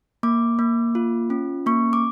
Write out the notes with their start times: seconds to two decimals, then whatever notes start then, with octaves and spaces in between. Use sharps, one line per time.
0.23 A#3 D6
0.59 A#3
0.95 F4
1.30 C#4
1.66 A#3 C#6
1.93 D6